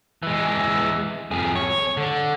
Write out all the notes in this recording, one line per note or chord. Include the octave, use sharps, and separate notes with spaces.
E3 G#3
F2 G#4
C#5
D3